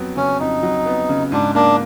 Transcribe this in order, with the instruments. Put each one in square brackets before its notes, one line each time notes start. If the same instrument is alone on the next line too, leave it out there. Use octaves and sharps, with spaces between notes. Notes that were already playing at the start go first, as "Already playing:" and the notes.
Already playing: [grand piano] F2 F#3 B3
[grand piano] C#3 [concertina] C#4
[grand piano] F2 [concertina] D#4
[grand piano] F#3
B3
C#3
[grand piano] G#2 [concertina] D4
[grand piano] A#3 [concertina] D4